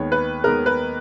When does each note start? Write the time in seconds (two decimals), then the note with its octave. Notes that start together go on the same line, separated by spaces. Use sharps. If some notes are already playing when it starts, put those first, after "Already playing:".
Already playing: D#2 D#3 G#3 B3 C#5
0.12 B4
0.44 D#2 D#3 G#3 B3 A#4
0.66 B4